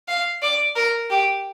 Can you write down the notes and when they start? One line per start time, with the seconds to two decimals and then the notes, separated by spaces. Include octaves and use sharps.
0.08 F5
0.42 D5
0.76 A#4
1.10 G4